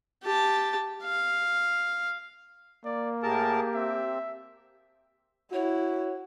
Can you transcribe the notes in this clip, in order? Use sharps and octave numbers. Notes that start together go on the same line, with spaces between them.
G4 A5
F5
A#3 D5
A2 G4 G#4 A#4 A5
C4 E5
E4 F#4 C#5